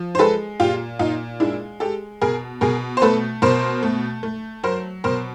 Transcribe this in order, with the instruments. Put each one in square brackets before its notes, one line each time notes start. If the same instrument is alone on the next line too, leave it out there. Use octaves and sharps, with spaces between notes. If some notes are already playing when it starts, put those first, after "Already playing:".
Already playing: [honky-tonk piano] F3
C5
G#3 A4 B4
A#2 F4 G4
A#2 D#4 F4
G#3 D4 E4
G#3 G4 A4
B2 G#4 A#4
B2 G#4 A#4
C5
A3 A4 B4
B2 A#4 C5
A3
A3
F#3 A#4 C5
B2 A#4 C5